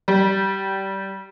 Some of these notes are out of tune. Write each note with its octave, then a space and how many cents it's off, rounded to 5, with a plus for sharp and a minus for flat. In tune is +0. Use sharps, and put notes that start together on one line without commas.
G3 -20